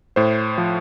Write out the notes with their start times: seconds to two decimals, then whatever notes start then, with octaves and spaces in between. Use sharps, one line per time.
0.16 A2 C5
0.58 F3